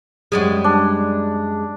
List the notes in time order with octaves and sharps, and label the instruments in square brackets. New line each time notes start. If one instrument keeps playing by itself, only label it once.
[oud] F#2 G3 G#3
[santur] D4